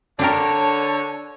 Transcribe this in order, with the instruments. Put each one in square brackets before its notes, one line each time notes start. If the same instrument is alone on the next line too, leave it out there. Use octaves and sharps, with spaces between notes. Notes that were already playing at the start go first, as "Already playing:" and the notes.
[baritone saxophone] D3 [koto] D4 G4 A#4 [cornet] C#5 [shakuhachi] A5